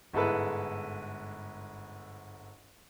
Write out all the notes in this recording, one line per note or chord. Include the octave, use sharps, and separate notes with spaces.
G1 G#2 G#3 E4 A4 B4